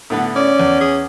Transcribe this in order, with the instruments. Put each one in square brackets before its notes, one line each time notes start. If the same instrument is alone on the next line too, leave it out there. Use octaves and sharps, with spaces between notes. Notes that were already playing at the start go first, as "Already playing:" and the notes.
[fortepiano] A2 D3 B3
[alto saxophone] C#4 [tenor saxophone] D5
[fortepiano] E2
[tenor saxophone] G#4